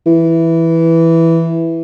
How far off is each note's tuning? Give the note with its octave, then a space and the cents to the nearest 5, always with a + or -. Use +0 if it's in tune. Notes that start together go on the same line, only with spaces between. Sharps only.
E3 +0